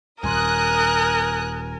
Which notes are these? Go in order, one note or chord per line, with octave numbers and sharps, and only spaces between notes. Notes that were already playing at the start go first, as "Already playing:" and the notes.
D#1 A#4 G#5 C6 D#6 F#6